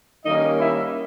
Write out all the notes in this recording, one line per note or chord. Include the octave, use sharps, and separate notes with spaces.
D#3 G3 A#3 C#4 D#4 D#5
E4 E5